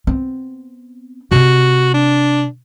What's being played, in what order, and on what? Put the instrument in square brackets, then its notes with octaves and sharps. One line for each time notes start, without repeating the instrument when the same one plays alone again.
[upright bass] B3 C4
[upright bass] C3 C4 [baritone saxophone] F#4
[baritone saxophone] D4